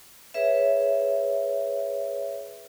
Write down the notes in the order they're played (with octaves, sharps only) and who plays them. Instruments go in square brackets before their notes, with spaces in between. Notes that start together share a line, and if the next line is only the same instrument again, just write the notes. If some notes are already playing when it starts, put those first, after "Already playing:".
[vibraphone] G#4 B4 C#5 E5